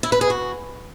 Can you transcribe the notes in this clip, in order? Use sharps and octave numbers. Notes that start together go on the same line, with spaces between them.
E4
B4
G#4
F#4